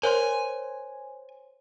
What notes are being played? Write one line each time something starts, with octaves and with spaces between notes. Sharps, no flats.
A#4 C5 C#5 G#5 C6